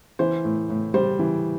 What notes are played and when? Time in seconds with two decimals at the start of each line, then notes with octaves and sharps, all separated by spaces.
0.19 E3 C5
0.44 A2
0.69 A2
0.94 G3 C5
1.19 E3